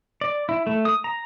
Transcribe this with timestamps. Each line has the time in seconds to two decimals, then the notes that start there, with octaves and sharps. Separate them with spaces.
0.21 D5
0.49 E4
0.67 A3
0.85 D#6
1.04 A#5